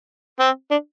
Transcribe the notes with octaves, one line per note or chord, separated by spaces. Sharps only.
C4
D4